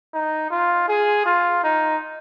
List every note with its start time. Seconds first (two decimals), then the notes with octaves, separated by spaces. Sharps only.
0.14 D#4
0.51 F4
0.88 G#4
1.26 F4
1.64 D#4